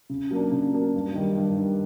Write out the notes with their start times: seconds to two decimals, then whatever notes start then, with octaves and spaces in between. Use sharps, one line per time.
0.10 C#3
0.30 F#3 A#3 D4
0.52 C#3
0.73 F#3 A#3 D4
0.94 G2
1.15 D#3 G3
1.36 G2
1.58 D#3 G3